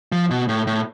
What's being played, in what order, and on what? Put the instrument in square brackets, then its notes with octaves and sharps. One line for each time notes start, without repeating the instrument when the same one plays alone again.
[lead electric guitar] F3
B2
A2
A2